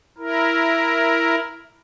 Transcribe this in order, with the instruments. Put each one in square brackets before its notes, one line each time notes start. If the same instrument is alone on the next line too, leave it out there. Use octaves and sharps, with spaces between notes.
[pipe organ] E4 A#4